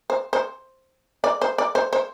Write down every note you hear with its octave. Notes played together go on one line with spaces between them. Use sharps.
C5
C5
D5
C5
D5
C5
C5